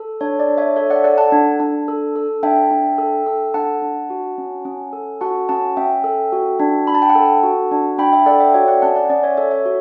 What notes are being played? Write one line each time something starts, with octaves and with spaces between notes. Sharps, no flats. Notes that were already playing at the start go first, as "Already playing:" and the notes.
Already playing: A4
D4 C#5
D5
D4
C#5 E5
A4 C#5 E5
D5 F#5
A4 D5 F#5
F#5 A5
D4
D4
A4
A4
D4 E5 G5
D4
A4
A4
D4 F#5 A5
D4
F#4
C#4
C#4
A4
F#4 F#5 A5
C#4 F#5 A5
C#4 E5 G5
A4
F#4
D4
D4 B5
A5
G5
F#5 A5
A4
F#4
D4
D4 G5 B5
E5 G5
A4 D5 F#5
E5 G5
F#4 C#5 E5
D5 F#5
C#4 F#5 A5
D5 F#5
C#4 D5
C#5 E5
A4 C#5 E5
C#5 E5
F#4